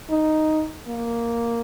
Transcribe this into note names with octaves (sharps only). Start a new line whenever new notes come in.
D#4
A#3